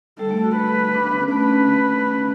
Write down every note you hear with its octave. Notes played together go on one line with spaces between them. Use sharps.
G3 A4
A3
F#4
B4
D4
B3
C#4
A3 B4
C#4